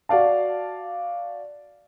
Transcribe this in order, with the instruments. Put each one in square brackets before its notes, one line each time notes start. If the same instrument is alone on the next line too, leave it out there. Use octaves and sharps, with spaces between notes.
[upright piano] F#4 D5 F5 A5